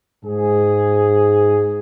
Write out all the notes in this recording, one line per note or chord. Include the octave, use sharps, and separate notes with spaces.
G#2 G#4